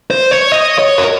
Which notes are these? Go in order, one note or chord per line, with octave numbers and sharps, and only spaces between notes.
C5
C#5
D#5
C#5
A#4